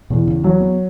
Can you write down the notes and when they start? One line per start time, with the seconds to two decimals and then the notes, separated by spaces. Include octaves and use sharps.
0.10 E2 B2
0.27 C#3
0.44 E3 F#3
0.61 B3